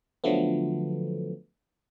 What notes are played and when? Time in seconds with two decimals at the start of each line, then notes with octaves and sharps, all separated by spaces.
0.24 D3 F3 F#3 A3 B3